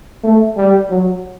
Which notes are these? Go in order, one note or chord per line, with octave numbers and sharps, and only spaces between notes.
A3
G3
F#3